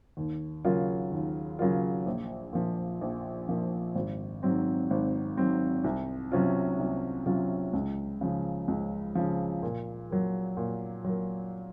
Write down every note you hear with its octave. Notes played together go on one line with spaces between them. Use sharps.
D#2
C#3 F#3 A#3 F4
D#2
C#3 F#3 A#3 F4
A#1
A#2 F3
A#1
A#2 F3
G#1
G#2 F#3 C4
G#1
G#2 F#3 C4
C2
C3 F#3 C#4 F4
C2
C3 F#3 C#4 F4
C#2
C#3 F3
C#2
C#3 F3
A#2
F#3 A#3
A#2
F#3 A#3